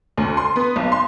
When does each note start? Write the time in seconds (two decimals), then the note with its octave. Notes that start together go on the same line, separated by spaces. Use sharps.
0.17 D2
0.37 C6
0.56 B3
0.76 B1
0.92 C6